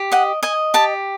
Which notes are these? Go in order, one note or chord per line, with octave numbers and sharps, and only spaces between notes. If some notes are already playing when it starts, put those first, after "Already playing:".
Already playing: G4
D#5 F#5
D#5 G#5
G4 A5